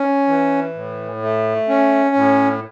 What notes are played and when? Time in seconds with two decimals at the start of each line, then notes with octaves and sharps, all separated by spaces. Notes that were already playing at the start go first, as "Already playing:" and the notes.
Already playing: C#4
0.28 E3
0.74 A2
1.22 A3
1.69 C#4
2.16 A2